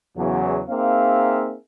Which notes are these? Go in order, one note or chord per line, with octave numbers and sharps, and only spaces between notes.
E2 C#3 F#3
A#3 C4 D#4 G#4 E5 F5